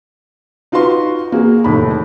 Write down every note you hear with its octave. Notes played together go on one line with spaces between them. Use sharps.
D#4 F4 F#4 B4 C6
A#3 F#4 G#4
F1 D#2 A2 B5